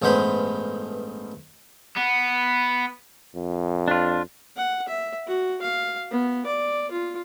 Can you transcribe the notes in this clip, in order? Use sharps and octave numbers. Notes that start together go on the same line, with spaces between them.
A1 G2 G#3 B3 C5 B5
B3
F2
D4 F4
F#5
E5
F#4
F5
B3
D5
F4